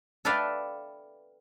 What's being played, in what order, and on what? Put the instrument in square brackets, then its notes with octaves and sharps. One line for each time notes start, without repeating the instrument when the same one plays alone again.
[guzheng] A4 B4 D5 E5 F5 G5